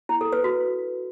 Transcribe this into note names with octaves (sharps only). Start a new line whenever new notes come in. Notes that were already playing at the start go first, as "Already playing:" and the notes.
E4
A4
B4
F#4